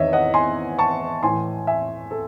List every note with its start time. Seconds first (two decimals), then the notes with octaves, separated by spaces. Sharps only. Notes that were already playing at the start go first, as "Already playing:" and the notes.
Already playing: E2 D#3 C#5 D#5 E5
0.13 D#5 F#5
0.34 G#5 C6
0.79 A5 C#6
1.23 A2 E3 G#5 C6
1.67 E5 G#5
2.11 A4